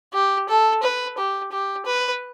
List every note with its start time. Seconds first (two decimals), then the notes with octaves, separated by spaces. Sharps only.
0.13 G4
0.49 A4
0.82 B4
1.18 G4
1.52 G4
1.86 B4